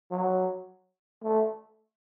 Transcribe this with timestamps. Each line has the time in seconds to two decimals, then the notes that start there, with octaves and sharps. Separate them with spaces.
0.11 F#3
1.23 A3